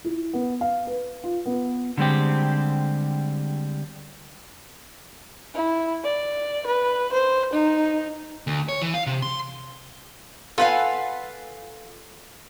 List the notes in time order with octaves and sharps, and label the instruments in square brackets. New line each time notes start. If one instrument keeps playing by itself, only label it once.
[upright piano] E4
B3
F5
B4
F4
B3
[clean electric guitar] D3 G3 G#3 C4 G4
[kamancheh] E4
D5
B4
C5
D#4
[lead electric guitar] D2
C#5
E3
F5
C3
C6
[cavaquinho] F4 F#5 G#5 [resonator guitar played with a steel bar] A4 B4 F5